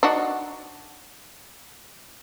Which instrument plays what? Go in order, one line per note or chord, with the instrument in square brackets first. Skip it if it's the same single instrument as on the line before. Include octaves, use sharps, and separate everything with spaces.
[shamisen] D4 D#4 F#4